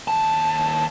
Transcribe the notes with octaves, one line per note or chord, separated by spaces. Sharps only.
D#2 A5